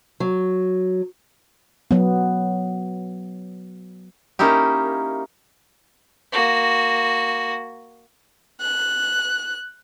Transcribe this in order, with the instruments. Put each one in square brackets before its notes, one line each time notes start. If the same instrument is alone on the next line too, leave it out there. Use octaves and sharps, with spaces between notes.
[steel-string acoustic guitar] F#3
[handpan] F#3 B3
[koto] A#3 C#4 D#4 E4 G4
[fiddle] A#3 F#4
[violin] F#6